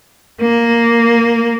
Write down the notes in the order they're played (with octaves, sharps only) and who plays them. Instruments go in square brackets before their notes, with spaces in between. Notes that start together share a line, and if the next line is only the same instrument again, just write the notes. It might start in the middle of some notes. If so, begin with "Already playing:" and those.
[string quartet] A#3